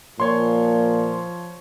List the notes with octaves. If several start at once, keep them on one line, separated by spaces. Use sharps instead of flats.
A#2 F3 C#5 C6